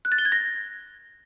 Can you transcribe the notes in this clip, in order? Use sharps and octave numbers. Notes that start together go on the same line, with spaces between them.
F#6
A6
G7
G#6
A#6